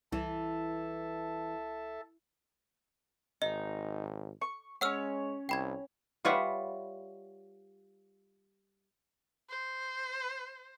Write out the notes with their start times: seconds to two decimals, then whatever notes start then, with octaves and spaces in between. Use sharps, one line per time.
0.12 C2 E3 A4 E5 A5
3.42 G#1 D#4 D#5
4.41 C#6
4.81 G#3 C#4 C#5 F#5 E6 F6
5.49 C2 G5 B5 G#6
6.25 G3 F4 B4 C#5 E5 F#5
9.50 C5